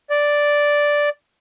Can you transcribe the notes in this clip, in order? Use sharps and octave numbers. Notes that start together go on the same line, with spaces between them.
D5